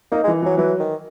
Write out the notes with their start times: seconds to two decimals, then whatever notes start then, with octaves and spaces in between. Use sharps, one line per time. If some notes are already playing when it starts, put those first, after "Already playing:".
0.12 A#3 D#4
0.24 G#3
0.27 E3
0.42 E3 F#3
0.57 E3 F#3
0.80 D#3